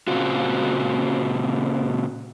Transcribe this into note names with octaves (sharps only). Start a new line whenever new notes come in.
A#2 C#3 C4 F4 F#4